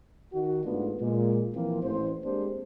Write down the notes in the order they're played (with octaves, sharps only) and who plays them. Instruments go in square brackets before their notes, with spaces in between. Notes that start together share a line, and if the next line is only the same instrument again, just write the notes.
[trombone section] D#3 F#4
G#2 A3 B3 D4 F4
A#2 G#3
E3 F3 A#3 C4 F4
A1 C5
G#3 A#3 C4 D4 G4 C5